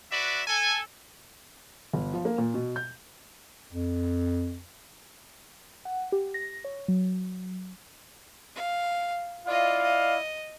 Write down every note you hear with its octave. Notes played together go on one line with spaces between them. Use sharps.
F#4 B4 D5 E5
A4 G#5
G1
F3
A#3
A#2
B2
G6
F2
F#5
G4
A#6
C#5
F#3
F5
E4 F4 D5 D#5 F5
D#5